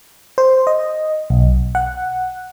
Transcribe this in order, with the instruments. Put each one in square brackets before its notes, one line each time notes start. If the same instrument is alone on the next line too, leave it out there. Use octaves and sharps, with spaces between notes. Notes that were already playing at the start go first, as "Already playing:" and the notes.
[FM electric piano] C5
D#5
B1
F#5